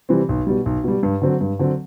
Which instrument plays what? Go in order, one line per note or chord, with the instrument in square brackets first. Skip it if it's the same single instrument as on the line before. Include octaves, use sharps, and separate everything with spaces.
[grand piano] C3 E3 G3 C4
B1
B2 G3
B1
B2 G3
G2
D3 F#3 C4
G2
D3 F#3 C4